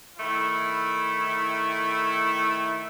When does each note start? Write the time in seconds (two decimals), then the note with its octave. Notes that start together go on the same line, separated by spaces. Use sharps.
0.18 D#3 A3 E4